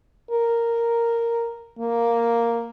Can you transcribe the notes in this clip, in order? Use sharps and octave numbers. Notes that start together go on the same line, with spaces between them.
A#4
A#3